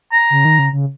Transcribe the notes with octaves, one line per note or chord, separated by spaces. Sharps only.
A#5
C#3
D#3
C#3
C#3